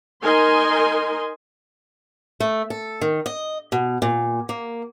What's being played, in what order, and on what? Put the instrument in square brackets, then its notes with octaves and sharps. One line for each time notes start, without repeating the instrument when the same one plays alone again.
[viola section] D#4 A#4 D#5 G#5 C6
[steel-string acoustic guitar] A3
A4
D#3
D#5
B2
A#2
A#3